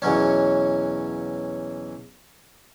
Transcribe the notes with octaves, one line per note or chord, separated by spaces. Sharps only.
E2 B2 F#3 C#4